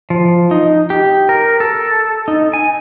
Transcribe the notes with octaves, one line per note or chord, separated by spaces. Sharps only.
F3
D#4
G4
A#4
A4
D#4
G#5